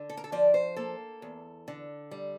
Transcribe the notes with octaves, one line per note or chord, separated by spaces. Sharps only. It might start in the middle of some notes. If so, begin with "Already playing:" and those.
Already playing: D3
A4
A#4
A4
F3 D5
C5
A#3 A4
E2
D3
G3